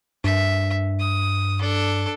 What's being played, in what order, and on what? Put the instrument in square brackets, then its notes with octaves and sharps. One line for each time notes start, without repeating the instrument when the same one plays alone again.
[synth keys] G2 [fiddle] E5
[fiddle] D#6
D4 A4